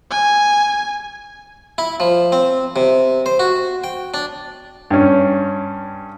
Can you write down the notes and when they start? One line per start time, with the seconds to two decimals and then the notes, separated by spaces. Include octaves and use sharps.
0.11 G#5
1.78 E4
2.00 F3
2.32 C4
2.76 C3
3.26 C5
3.39 F#4
3.84 G5
4.14 D4
4.91 G2 C#4